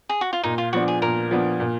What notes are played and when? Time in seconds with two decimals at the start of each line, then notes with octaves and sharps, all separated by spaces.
0.09 G#4
0.21 F#4
0.33 F4
0.43 A#2 D#4
0.58 F4
0.73 F3 B3 D4 F#4
0.88 G#4
1.02 A#2 A#4
1.31 F3 B3 D4
1.60 A#2